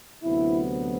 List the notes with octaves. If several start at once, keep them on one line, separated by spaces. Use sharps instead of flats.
D2 C3 F#3 B3 E4